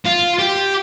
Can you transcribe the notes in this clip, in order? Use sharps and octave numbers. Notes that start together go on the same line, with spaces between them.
F4
G4